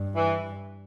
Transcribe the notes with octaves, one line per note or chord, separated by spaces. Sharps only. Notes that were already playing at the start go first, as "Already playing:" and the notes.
Already playing: G2
E3